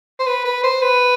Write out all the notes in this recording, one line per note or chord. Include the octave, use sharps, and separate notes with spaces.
C5
B4
B4
C5
B4